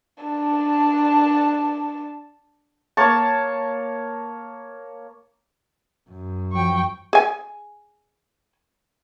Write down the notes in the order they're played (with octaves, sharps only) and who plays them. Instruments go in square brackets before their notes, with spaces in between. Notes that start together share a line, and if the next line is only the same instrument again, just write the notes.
[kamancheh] D4 A5
[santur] A#3 C#5 A5
[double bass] F#2
[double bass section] F3 F#3 [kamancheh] G5 C#6
[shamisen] G#4 G#5